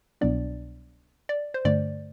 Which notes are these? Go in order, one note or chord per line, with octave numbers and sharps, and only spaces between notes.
C2 B2 F#3 B3 D4 D5
D5
C5
G2 D3 A3 D5